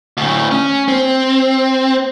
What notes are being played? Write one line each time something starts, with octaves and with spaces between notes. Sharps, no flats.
D2 A2
C#4
C4